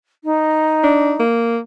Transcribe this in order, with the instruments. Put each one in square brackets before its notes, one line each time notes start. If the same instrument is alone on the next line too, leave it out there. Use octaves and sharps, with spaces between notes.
[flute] D#4
[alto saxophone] D4
A#3